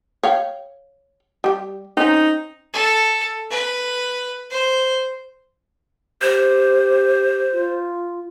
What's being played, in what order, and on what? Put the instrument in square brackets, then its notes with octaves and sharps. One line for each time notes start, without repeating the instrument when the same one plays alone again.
[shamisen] C#5 F5 G5
G3 G4
[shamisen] C4 C#4 [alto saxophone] D#4
[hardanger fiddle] A4
B4
C5
[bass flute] G4 [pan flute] C5
[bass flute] F4